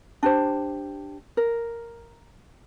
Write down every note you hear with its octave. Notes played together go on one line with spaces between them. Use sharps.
D4 G4 C5
A#4